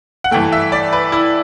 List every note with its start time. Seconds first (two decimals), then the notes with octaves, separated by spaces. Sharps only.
0.24 F#5
0.31 G2 E3 A3 G5
0.52 E5
0.72 D5
0.93 B4
1.12 E4